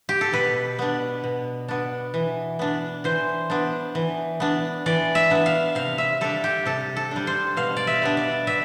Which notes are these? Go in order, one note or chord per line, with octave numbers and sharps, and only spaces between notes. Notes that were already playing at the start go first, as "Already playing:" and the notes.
G4
A4
B2 B4
B3 D4
B2
B3 D4
E3
B3 D4
E3 C5
B3 D4
E3
B3 D4
E3 D5
E5
B3 D4
F5
C3 F5
E5
G3 D4 A4
G4
C3 A4
A4
G3 D4
C5
B2 F5
D5
E5
G3 B3 D4
D5
B2 E5